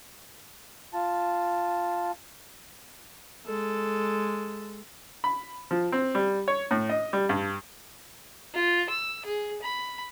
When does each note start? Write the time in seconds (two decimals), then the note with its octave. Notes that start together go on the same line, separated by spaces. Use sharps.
0.93 F4 A5
3.46 G#3 A4
5.24 B5
5.71 F3
5.92 C4
6.15 G3
6.48 C#5
6.71 A2
6.89 D#5
7.13 G3
7.29 G2
8.54 F4
8.90 E6
9.25 G#4
9.62 B5